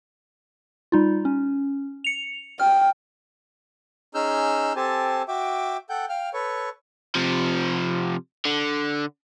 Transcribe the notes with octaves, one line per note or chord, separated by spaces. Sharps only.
G3 D#4 F4
C#4
C#7 F7
G5 F6
C#4 D#4 G#4 E6 F6 G6
C4 G4 A4 C5 G#5 A5
F#4 E5 G5 D6
A4 F#5 G5 G6
F5 G5 F6
A4 B4 C#5 C#6
C3 F3
D3